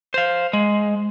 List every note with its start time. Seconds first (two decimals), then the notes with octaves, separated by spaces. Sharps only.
0.14 C5 F5
0.53 G#3